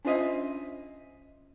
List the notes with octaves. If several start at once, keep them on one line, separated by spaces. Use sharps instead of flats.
C#4 D4 F4 C5 D#5 E5